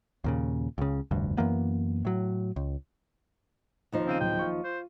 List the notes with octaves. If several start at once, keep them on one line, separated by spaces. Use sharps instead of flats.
D#2 A#2 C#3
C#2 C#3
F1 D2 G2
F#2 E3 A#3 B3
A2 F#3
C#2
D#2 F3 D#4
C#3 C4 F5 D#7
D1 G5
F4 C#6
C5